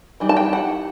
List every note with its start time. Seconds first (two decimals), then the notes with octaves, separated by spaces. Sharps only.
0.20 E3 G3 D#4
0.29 A5
0.37 G5
0.53 F#5